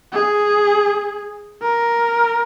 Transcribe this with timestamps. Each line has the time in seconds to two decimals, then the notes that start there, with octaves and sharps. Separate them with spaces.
0.13 G#4
1.62 A#4